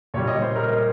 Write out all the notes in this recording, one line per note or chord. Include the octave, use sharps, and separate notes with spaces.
A#2 G3 C#5
D#5
C5
A#4
A#4